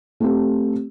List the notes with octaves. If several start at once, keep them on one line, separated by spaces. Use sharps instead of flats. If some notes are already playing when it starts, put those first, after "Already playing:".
A3 C4 G4